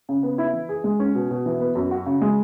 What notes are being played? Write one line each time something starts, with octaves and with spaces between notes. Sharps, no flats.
C#3
B3
E4
E3
G#4
G#3
C#4
B2
B2
E3
B3
F#2
F#4
C#3
G#3